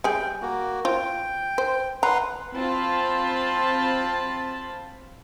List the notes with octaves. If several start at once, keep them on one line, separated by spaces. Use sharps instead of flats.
G3 G#4 G5
A#3 F#4
F4 C5 G5
C5
B4 F#5 A#5 C6
C4 F4 A5 B5